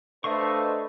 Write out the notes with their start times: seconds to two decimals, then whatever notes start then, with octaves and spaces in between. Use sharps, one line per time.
0.24 A3 D4 B4 C5 D#5 F5 C#6